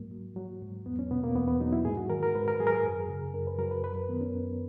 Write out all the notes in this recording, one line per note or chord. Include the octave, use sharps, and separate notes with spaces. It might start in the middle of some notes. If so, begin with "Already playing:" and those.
Already playing: G#2 F#3 A#3
F#3
F#3
G#2
E2 B3
C#4
B2 B3
A#3
E2 B3
B3
F#3 D#4
E4
G#2 G#4
F#4
D#3 A#4
A#4
G#2 B4
A#4
F#3 G#4
A#4
G#4
F#2
C#3
F#2 A#4
B4
F#3 A#4
B4
F#2 B4
A#4
D#3 B3
C#4
F#2